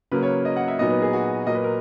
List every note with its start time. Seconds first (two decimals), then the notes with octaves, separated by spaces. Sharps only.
0.12 C#3 F#3 A#3 B4
0.23 C#5
0.45 D#5
0.56 F#5
0.68 E5
0.79 A#2 F#3 B3 D#4 D#5
0.90 B4
1.02 G#4
1.13 F#4
1.47 A#2 F#3 A#3 D#5
1.55 B4
1.64 A#4